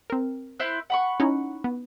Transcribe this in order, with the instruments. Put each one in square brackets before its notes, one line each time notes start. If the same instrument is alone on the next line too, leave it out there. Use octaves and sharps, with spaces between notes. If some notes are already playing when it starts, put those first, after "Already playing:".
[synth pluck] C4 A#4
[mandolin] E4 C5 F#6
F#5 B5 C#6
[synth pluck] C#4 D#4 E4
B3